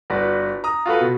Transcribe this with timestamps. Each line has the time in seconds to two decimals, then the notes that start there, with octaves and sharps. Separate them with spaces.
0.10 G1 F#4 B4 D5
0.64 A#5 D#6
0.86 F4 F#4 A4 B4
1.01 B2